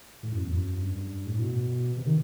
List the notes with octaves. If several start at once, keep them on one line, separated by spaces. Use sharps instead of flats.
A2
F#2
E2
F#2
G2
A2
B2
C3
D#3